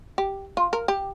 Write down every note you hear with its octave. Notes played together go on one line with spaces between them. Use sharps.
G4
F4
A#4
G4